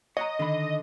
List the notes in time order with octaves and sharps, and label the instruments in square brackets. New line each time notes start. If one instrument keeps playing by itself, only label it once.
[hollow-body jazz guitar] C#5 F#5 A#5 [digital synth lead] D#5
[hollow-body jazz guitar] D3 D#3 B5